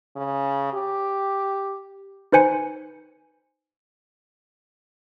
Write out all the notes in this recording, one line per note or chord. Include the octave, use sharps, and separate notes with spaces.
C#3
G4
D#4 B4 C5 G#5 C#7